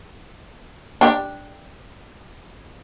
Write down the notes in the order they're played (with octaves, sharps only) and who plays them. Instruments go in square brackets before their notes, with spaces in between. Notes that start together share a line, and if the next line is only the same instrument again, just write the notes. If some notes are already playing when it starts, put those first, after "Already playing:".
[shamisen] D4 G4